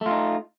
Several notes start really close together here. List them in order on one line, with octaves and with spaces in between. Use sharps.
A3 F4 D#4